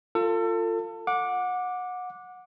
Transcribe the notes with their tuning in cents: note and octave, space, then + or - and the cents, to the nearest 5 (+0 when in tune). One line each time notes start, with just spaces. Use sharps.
F4 +0 A4 +30
F#5 -25 D6 +0